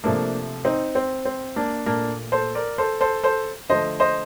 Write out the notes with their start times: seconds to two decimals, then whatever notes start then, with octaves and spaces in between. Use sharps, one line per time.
0.04 C3 F3 A3 A#3 D4
0.65 C4 D#4
0.95 C4
1.25 C4
1.56 A#3 D4
1.86 A#2 A3 A#3 D4
2.32 A4 C5
2.55 A#4 D5
2.78 A4 C5
3.01 A4 C5
3.23 A4 C5
3.69 D3 F3 A3 C5 D#5
4.00 C5 D#5